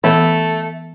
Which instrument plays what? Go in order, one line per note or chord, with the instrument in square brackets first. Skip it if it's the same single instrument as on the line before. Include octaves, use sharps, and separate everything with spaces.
[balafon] E3 B3 [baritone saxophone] A3 [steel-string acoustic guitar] E5